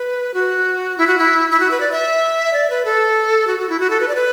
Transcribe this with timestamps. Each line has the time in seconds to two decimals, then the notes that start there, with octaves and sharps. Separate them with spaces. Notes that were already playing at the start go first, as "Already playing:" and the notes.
Already playing: B4
0.34 F#4
0.98 E4
1.07 F#4
1.19 E4
1.51 E4
1.60 F#4
1.71 B4
1.80 D5
1.92 E5
2.53 D5
2.70 B4
2.85 A4
3.47 F#4
3.59 F#4
3.69 E4
3.80 F#4
3.90 A4
4.00 B4
4.08 D5
4.15 B4